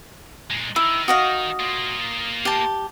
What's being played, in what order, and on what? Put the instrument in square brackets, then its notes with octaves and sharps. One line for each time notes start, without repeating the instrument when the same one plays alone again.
[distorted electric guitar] A#2 G#3
[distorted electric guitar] D#3 [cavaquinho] E4 [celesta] E6
[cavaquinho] F#4 D#5 F5 [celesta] D#6
[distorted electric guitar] A#3 F4
[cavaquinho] G4 A5